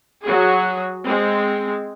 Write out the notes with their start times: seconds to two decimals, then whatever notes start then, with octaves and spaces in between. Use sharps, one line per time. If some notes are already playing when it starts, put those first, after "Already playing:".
0.23 F#3 F#4 G#4
1.05 G#3 C4